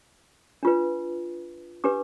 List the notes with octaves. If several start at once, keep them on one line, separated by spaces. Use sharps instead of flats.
D4 F4 B4
D4 G4 B4 D6